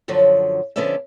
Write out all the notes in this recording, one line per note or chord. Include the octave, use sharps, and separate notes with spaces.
F#2 D3 F3 F#3
D3 F3 B3 C#4 D5 E5